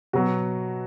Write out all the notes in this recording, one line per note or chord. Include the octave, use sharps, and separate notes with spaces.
B2 F#3 F#4